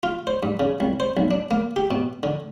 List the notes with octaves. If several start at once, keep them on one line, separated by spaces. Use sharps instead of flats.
F4
C5
G2
C#3
C2
C5
B1
D4
A#3
G4
B2
D3